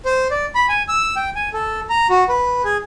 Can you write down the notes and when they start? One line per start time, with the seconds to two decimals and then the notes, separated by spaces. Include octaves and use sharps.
0.05 C5
0.31 D5
0.55 B5
0.69 G#5
0.89 E6
1.16 G5
1.36 G#5
1.53 A4
1.90 A#5
2.10 F#4
2.29 B4
2.64 G#4